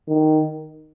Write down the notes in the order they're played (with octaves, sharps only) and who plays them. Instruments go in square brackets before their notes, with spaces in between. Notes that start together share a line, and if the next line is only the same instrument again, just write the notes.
[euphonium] D#3